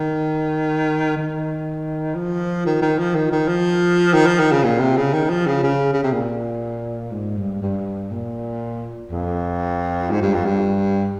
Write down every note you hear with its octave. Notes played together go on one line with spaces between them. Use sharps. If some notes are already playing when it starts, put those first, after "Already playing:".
Already playing: D#3
D#3
F3
D#3
D#3
F3
D#3
D#3
F3
D#3
F3
D#3
C#3
A#2
C3
C#3
D#3
F3
C#3
C#3
C#3
C3
A#2
G#2
G2
G2
A#2
F2
G#2
G2
F2
G2